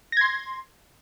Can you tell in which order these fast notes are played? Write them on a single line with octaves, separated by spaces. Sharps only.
A#6 G#6 C6